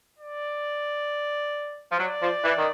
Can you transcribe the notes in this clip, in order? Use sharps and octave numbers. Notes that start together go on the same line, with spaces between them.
D5
F3
F#3 D5
F3
E3
D#3